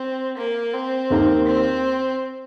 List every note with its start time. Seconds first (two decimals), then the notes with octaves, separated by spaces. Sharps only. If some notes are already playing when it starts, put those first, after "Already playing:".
Already playing: C4
0.37 A#3
0.73 C4
1.10 D#2 D#3 A#3 G4 A#4
1.47 C4